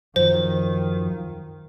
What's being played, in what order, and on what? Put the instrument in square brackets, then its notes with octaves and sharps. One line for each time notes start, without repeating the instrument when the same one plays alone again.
[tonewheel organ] F#2 F3 [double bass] D#3 [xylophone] C5